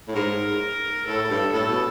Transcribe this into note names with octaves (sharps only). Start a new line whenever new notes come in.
A2
G#2 A#4
A2 A4
G2
A2 A4
B2